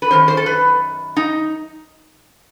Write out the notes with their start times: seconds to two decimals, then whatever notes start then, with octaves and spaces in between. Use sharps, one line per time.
0.02 B4
0.11 F#2 D#3 C5
0.28 C5
0.37 A4
0.46 B4
1.17 D#4